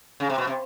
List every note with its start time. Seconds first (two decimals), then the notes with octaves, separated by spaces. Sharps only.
0.20 C#3
0.30 C3
0.38 B2
0.47 C3